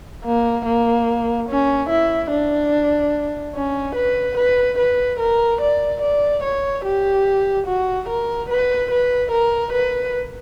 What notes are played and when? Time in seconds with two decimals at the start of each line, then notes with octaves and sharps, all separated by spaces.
0.25 A#3
0.66 A#3
1.49 C#4
1.90 E4
2.31 D4
3.55 C#4
3.95 B4
4.37 B4
4.79 B4
5.20 A#4
5.61 D5
6.01 D5
6.43 C#5
6.84 G4
7.67 F#4
8.09 A#4
8.50 B4
8.91 B4
9.32 A#4
9.73 B4